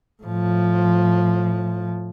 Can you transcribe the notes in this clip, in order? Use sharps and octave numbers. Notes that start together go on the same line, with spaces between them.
A2 F3